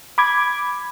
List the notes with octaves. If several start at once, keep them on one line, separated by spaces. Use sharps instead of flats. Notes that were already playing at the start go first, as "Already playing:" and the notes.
B5 D6 G#6